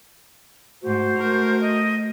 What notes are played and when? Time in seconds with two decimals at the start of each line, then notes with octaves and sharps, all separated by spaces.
0.83 G#2 A3 F#4 C5
1.16 A3 A#4
1.60 D#5